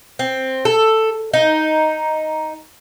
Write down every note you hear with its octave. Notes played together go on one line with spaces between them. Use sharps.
C4
A4
D#4